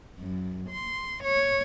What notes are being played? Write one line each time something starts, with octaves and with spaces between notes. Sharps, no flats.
F#2
C6
C#5